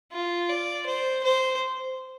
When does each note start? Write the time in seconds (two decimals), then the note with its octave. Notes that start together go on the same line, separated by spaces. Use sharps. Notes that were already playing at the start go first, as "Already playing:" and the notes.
0.12 F4
0.49 D5
0.86 C5
1.23 C5